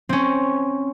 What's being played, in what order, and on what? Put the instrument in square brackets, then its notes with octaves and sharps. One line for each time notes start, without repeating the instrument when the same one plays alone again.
[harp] C4 C#4